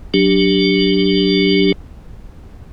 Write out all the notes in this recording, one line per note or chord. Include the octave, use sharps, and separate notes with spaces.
F#3 D4 G4